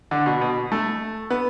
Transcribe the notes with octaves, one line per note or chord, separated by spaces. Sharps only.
D3
B2
B2
A3
B3